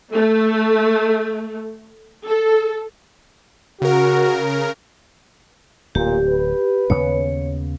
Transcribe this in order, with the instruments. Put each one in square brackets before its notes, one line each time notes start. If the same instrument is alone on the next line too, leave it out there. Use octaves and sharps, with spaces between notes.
[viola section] A3
A4
[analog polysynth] C#3 A#4 [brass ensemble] F#4
[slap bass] D1 [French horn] A#2 [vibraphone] G4
[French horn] B4
[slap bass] D#2 C#3 B3 [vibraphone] C#5